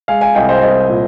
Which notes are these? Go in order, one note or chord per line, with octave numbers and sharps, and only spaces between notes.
G#3 F5 G#5
F5 G#5
C2 D#5 G5
C5 D#5
C2 C5 D#5
A#2